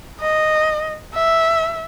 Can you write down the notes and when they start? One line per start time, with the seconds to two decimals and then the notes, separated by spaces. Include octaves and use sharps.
0.20 D#5
1.14 E5